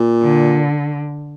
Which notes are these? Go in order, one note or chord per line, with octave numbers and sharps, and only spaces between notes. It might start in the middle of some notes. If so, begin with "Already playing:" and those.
Already playing: A#2
D3